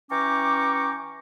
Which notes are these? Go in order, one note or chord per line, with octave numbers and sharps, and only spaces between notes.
E3 C#4 G5 A#5 C#6 D6